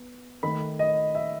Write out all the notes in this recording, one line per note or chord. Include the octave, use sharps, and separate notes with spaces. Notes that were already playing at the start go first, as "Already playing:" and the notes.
Already playing: B3
D#3 A3 B5
D#5
E5